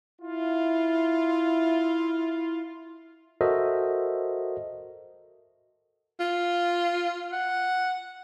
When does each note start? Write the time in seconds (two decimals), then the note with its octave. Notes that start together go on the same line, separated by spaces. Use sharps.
0.21 E4 F4
3.41 F#4 A4 A#4 C5 D#5 E5
6.20 F4
7.32 F#5